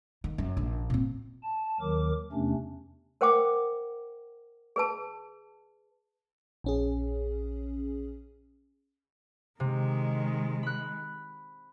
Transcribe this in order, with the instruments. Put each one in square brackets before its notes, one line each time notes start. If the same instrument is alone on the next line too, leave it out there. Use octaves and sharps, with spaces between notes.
[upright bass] D#3
F#2
A#1
A#2 C4
[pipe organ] A5
D#2 D#3 F#3 A#4 D6
E2 C3 A3 C#4 D4
[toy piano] A#4 C5 F#5 G5 D6 D#6
G#4 B4 A5
[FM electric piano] A#1 C#4 G#4
[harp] C3 [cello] D#3 G#3
[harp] B5 F#6